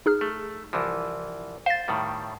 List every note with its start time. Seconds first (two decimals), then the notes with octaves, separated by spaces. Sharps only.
0.06 D#4 G#4 F6
0.21 A3
0.73 C2 E3 F3
1.66 C5 F5 A6
1.88 A2 D#3 G3